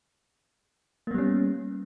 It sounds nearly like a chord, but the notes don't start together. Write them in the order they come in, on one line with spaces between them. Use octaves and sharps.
A#3 B3 G3 C#4